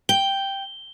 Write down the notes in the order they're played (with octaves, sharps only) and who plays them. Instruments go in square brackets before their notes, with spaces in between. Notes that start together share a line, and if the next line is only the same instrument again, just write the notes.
[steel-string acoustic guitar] G5 [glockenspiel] G7